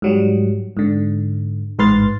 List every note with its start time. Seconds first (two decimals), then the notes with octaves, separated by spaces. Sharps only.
0.02 G#2 F#3 G3
0.77 G#2 D3
1.79 A1 G#2 B4 C6 F6 A6